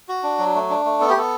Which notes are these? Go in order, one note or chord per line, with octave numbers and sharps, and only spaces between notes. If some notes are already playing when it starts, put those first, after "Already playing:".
F#4
D4
F#3
A3
D4
A3
B3 A4
G4
B3 A4